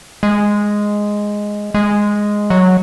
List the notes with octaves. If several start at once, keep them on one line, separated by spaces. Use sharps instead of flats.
G#3
G#3
F#3